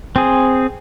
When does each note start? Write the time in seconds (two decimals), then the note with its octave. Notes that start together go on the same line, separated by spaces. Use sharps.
0.16 C4 G#4